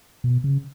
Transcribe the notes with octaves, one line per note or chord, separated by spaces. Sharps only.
B2
C#3